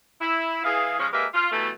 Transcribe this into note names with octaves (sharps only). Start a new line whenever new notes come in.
E4
E3 G#4 F5
C#3 F3 G#3 C#4
G#3 A#3 G4 A#4 B4 E5
F4
B2 E3 G3 A3